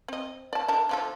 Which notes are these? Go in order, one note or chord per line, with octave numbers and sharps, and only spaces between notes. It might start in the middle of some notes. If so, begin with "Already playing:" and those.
C4 D#5
D5 A5
D3 A#4 A5
D3 F3 A4